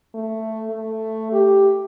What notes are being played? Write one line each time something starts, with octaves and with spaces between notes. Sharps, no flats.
A3
A3
G4